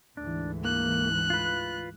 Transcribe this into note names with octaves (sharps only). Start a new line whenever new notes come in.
D2 G#2 E3 D4
A#3 F#6
F4 B4